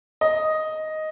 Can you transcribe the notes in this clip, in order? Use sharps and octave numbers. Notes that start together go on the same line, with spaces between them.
D#5